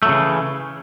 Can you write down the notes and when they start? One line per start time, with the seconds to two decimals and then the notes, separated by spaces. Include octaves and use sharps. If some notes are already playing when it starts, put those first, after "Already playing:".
0.03 A3
0.06 F#3
0.09 C#3
0.12 E3